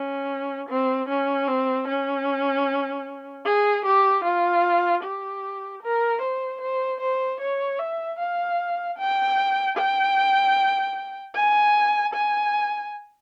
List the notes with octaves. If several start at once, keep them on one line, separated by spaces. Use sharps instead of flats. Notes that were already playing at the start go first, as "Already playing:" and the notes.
Already playing: C#4
C4
C#4
C4
C#4
G#4
G4
F4
G4
A#4
C5
C5
C5
C#5
E5
F5
G5
G5
G#5
G#5